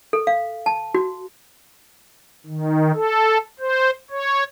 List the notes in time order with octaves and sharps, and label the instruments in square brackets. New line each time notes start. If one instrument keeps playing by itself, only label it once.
[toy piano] A4
F5
A5
F#4
[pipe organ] D#3
A4
C5
C#5